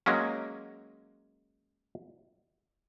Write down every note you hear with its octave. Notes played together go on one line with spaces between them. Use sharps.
F#3 G#3 A#3 C#4